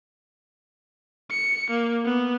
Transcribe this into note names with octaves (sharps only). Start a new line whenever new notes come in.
C#7
A#3
B3